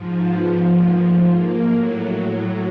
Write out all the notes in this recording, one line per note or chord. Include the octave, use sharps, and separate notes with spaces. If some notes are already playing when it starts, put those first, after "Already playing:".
Already playing: G#2 F3
B3
A#3
A3
A#3
A2 F#3